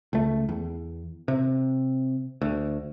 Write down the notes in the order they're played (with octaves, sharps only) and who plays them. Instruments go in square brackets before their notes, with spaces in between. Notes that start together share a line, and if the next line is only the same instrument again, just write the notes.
[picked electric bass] C#2 A3
E2
C3
D2